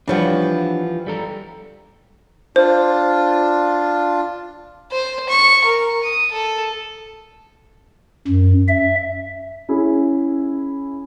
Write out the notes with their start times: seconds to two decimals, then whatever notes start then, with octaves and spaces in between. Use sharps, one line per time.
0.08 E3 F3 G3 D4 C#5 F#5
1.07 G3 A4 A#5
2.56 D4 F4 C5
4.91 C5
5.29 C#6
5.64 A#4
6.03 D#6
6.32 A4
8.28 F#2
8.68 E5
9.69 C#4 E4 G#4